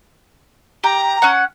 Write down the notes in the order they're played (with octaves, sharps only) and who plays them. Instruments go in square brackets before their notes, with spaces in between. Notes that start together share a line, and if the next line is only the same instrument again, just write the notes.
[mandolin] G4 [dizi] A#5
[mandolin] C#4 F#5